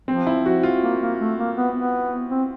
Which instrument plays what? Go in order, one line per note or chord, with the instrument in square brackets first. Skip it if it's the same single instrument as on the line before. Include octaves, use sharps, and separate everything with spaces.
[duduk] F3 [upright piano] C4
[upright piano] E4
F#4
F4
[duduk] A#3
A#3
A3
A#3
B3
B3
C4